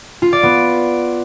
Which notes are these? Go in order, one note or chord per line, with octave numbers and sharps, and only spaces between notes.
F4
D5
B3